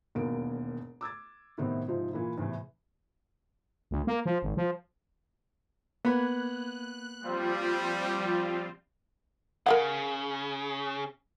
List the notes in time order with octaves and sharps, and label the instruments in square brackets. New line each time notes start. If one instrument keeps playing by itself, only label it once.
[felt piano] E1 D#2 F#3 A#3 B3 D7
D6 E6 G#6 A6
A2 C3 D#3 B3 C4
G#2 C3 F3 D#4
A#2 E3 A#3 E4
E2 A2 C3 E3
[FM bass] D2
A#3
F3
G#1
F3
[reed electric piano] A#3 B5 G#6 [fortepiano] B3 [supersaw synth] F#6
[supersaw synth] F3 C4 F4 [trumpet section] G3
[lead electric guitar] C#3 [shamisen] A#4 F5 F#5